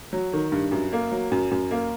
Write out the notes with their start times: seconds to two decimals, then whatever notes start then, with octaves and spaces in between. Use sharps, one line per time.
0.13 F#3
0.33 D#3
0.52 G2
0.72 F#2
0.92 A#3
1.12 F#3
1.32 F#2
1.51 F#2
1.71 A#3